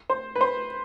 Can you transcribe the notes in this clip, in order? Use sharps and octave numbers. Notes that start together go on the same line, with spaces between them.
C5
B4
C5